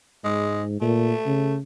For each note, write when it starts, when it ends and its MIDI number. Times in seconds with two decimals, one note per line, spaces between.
0.25 0.80 44
0.25 0.63 56
0.81 1.12 46
0.81 1.54 57
1.26 1.60 49